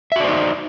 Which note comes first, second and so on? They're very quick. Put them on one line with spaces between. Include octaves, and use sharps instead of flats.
E5 F#4 D5 C5 D#4